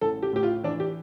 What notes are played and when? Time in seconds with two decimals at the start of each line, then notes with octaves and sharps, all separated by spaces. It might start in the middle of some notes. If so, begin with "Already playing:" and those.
0.01 A1 A4
0.23 G4
0.33 A2 G4
0.43 F4
0.63 E3 D4
0.80 G4